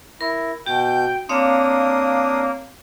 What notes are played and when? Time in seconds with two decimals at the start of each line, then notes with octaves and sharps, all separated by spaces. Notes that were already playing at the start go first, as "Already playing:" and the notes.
0.21 E4 A#4
0.66 B2 F#4 G5 G6
1.29 A#3 C4 D4 C#5 F5 D#6